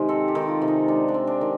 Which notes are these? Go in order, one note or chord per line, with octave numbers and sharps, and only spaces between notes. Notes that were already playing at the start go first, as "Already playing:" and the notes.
Already playing: C3 D#3 G#3
C4 A4
G4
D#3
F4
C3
D#4
G#3 D4
D4
C4
D4
D#3